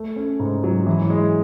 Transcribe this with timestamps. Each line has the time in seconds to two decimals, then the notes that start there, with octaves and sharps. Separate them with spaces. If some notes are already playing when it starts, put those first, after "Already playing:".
Already playing: A3
0.16 C#4
0.40 G#2
0.64 F#3
0.87 E3
1.10 G#3